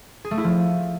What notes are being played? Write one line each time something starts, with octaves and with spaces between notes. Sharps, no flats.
G#4
A3
E4
F3